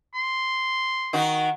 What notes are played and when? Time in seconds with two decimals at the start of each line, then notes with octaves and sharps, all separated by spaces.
0.14 C6
1.13 D#3 D#4 F#4